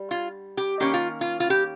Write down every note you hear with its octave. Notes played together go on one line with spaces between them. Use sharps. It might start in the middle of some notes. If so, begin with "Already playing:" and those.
Already playing: G3
F4
G4
D#3 A#3 C#4 G4
F4
F4
F4
G4